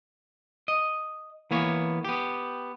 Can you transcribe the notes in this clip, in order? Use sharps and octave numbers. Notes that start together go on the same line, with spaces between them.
D#5
E3 A#3 B3 C#5
B3 G4